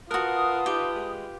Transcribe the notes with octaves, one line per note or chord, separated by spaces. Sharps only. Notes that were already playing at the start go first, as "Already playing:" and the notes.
F4 F#4 A#4 B4 F#5 A5 D#6
D#4 G4
G#3